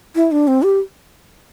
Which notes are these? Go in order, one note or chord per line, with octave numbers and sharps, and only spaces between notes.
E4
D4
C4
G4